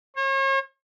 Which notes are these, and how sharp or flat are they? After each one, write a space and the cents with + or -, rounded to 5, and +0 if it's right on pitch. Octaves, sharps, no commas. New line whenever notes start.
C#5 -40